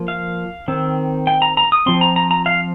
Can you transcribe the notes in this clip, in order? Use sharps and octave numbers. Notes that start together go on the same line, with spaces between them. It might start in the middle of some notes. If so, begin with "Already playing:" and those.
Already playing: F3 A#3
F5
D#3 C4
G5
A#5
A#5
D#6
F3 C4 C6
A#5
A#5
A#5
F5